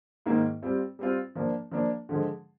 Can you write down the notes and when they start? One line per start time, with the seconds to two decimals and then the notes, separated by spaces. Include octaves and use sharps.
0.26 G#2 D#3 A#3 D#4
0.62 G3 C4 F4
0.99 G3 C4 F4
1.36 F3 A#3 D4
1.72 F3 A#3 D4
2.09 D3 F3 G#3